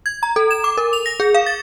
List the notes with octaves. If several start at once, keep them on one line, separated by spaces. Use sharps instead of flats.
G#6
A#5
A4
E7
D6
A#4
F7
A#6
G#4
F5
A6